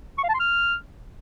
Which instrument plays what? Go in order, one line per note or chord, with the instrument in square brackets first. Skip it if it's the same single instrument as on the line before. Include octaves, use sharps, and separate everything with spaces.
[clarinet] C#6
F5
A5
C6
F6